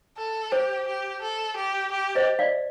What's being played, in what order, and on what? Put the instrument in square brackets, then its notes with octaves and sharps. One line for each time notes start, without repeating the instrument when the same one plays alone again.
[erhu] A4
[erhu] G4 [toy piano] C5
[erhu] G4
A4
G4
G4
[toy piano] C5 D#5
D5 F5